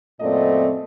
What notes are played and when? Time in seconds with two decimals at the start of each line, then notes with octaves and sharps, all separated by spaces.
0.21 F#2 A#2 A3 C4 D5 D#5